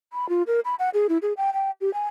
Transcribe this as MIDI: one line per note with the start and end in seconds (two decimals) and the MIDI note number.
0.13 0.29 83
0.29 0.43 65
0.47 0.60 70
0.65 0.75 83
0.79 0.90 78
0.94 1.07 68
1.09 1.18 64
1.22 1.33 68
1.37 1.51 79
1.53 1.71 79
1.81 1.92 67
1.94 2.07 80